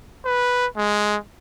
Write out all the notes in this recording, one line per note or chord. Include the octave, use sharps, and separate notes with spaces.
B4
G#3